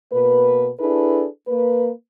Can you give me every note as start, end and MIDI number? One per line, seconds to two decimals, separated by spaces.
0.13 0.71 47
0.13 0.71 58
0.13 0.71 71
0.80 1.27 62
0.80 1.27 64
0.80 1.27 68
0.80 1.27 69
0.80 1.27 71
1.47 1.90 58
1.47 1.90 71